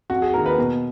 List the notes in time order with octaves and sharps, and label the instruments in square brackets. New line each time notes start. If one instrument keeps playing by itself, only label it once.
[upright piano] F2 F#4
G#4
D#3 A#3 A#4
B4
B2